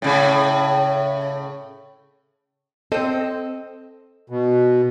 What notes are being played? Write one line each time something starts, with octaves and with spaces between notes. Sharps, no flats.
A2 C#3
C4 A4 C5 D#5
B2